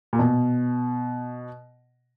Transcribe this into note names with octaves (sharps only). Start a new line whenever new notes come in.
A#2
B2